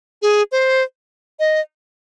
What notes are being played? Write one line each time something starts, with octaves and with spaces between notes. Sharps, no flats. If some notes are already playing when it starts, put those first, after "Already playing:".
G#4
C5
D#5